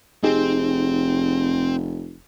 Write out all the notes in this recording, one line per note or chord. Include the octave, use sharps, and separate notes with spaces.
F1 C4 D#4 G4 G#4